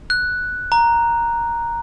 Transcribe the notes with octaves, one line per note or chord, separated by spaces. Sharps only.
F#6
A#5